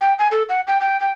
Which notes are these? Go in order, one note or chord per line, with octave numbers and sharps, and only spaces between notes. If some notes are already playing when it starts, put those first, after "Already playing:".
G5
G#5
A4
F#5
G5
G5
G5